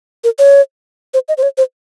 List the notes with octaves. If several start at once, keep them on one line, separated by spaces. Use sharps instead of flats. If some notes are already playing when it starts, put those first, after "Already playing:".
A#4
C#5
C5
D#5
C5
C#5
C5